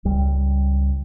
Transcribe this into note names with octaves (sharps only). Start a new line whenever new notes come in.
C#2 G3